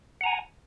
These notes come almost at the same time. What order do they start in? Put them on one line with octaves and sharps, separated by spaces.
F#5 A#5 G#5